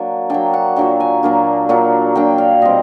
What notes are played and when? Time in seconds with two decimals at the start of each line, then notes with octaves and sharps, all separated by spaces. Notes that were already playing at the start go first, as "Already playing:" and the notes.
Already playing: F#3 A#3 D4 D5
0.30 F#3 A#3 D4 G5
0.54 F#5
0.76 A#2 F#3 A#3 D4 G5
1.00 G#5
1.23 A#2 F#3 A#3 D4
1.69 A#2 F#3 A#3 D4
2.15 A#2 F#3 A#3 D4 G5
2.38 F5
2.62 B2 G3 C4 D#5